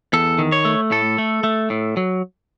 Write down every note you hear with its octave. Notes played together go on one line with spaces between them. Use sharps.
E2 A4
D#3
C#5
A3
A2 A4
A3
A3
A2
F#3